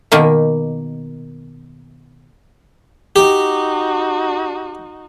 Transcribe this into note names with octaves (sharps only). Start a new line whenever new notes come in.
B2 D#3 A#3
D#4 F#4 G4